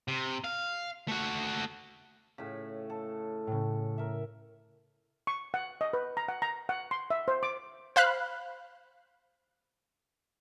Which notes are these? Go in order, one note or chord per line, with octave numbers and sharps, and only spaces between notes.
C3
F5
A3 F#4
A2 C#3 B6
A4
A2 C#3
A#4 E5
C#6
F#5
D#5
B4
A#5
F#5
A#5
F#5
C6
E5
C5
D6
C5 F5 B5 F#6